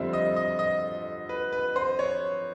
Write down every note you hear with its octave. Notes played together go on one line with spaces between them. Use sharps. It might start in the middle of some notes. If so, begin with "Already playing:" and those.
Already playing: F2 D3 G3 C4 E5
D#5
D#5
D#5
B4
B4
C5
C#5